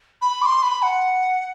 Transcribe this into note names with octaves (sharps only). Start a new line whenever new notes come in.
B5
D6
C6
B5
F#5